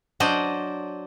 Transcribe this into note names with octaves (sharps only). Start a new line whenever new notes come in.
F#3 D4 C5 D#5